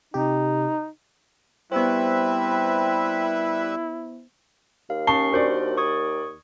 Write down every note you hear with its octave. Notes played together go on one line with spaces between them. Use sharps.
C3 D#4 G4
G3 B3 C4 E4 B4 C5 E5
D#2 F5
C#4 A5 C#6 C7 G7
D4 F#4 A#4 C5 D5
C#6 D#6 G#6